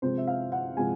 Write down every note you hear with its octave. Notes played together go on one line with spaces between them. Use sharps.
C3 F3 G#3 C5
E5
F5
F#5
C3 F3 G#3 G#5